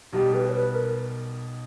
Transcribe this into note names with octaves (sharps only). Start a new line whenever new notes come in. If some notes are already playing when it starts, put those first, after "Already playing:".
B1 B2 G3 G4
B4
C#5
B4
A#4